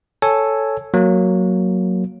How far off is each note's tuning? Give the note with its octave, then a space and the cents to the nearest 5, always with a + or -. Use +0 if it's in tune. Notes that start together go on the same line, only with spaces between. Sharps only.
A4 +0 C#5 +0 G#5 +0
F#3 +0 A#3 +0